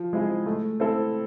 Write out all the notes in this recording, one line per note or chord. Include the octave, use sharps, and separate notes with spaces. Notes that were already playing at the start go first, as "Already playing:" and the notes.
Already playing: F3
G#3 C4 E4 G#4
A3
C4 E4 A4